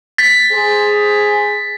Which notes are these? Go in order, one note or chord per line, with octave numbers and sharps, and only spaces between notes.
A6 B6
G#4 C5